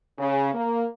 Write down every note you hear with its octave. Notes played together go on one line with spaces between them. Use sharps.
C#3
A#3